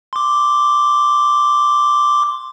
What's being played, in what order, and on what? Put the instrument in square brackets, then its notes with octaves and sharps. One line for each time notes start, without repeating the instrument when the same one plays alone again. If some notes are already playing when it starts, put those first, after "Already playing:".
[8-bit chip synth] C6 D6